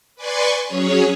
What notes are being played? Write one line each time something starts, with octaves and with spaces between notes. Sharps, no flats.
B4 D5 G#5 C6 C#6
F#3 C#4 G#4 C#5